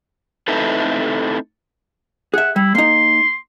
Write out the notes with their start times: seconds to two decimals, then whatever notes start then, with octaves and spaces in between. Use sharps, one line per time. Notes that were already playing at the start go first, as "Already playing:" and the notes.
0.48 A3 C4 D#4 E4 A4 B4
2.34 G#4 E5 F#5
2.56 G3 E4
2.75 A#3 D#4 C6